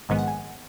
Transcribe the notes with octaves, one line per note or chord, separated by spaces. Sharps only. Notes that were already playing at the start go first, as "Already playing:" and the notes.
A#1 G#2 D#3 G#3 B3 G#5
F#5
G#5